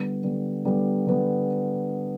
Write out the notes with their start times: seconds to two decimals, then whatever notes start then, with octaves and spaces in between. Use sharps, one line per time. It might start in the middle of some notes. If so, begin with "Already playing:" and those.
Already playing: D3 G3 B3
0.23 D3 G3 B3
0.65 D3 G3 B3
1.07 D3 G3 B3